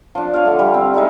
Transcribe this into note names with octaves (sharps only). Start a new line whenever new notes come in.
F3 D4
C#5 D5 F5
D3 A3
G3
C4
G#3 D#4 E4 A4